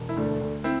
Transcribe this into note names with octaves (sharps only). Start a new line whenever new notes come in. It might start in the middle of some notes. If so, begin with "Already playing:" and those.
Already playing: E1
E4
D2 A3 D4
D2
C4 E4